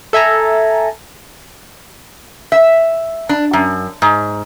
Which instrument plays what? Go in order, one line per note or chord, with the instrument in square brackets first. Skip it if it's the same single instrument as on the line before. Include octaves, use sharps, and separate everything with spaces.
[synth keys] A4 E5 G#5 A#5
[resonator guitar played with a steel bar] E5
D4
F#2
G#2